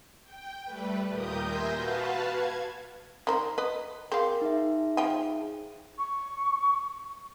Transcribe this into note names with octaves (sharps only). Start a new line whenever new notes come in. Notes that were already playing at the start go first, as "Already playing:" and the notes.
G5
G3 A3 B4
D#2 A#2 G4 A#4 D#6 G6
E5 G#5 C6 G6 A#6
F#4 B4 F5 A5
G#6
D#3 A#4 C5
B4 D#5
C4 G#4 A#4 F5
D#4 G#4 E5
F3 G5 G#5
C#6